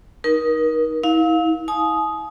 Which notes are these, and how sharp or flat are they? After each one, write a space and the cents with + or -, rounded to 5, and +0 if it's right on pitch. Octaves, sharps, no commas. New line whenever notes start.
D#4 +5 A#4 +35
E4 -40 F5 +20
G#5 +45 D#6 +0